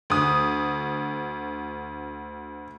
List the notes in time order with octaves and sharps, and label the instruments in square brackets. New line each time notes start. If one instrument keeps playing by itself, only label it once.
[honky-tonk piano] D2 D#6